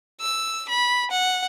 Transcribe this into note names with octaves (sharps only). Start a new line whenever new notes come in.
E6
B5
F#5